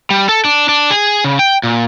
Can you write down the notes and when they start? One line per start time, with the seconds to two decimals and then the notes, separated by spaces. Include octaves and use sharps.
0.10 G3
0.29 A4
0.45 D4
0.69 D4
0.91 G#4
1.25 C#3
1.39 G5
1.64 A#2